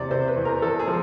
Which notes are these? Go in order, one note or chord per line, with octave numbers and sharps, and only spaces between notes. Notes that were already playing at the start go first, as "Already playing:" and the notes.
Already playing: E2 C3 C5 D5
C3 C5
B4
E2
A#4
E2 A4
G#4
F3